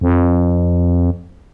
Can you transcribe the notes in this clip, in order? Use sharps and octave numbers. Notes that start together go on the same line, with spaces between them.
F2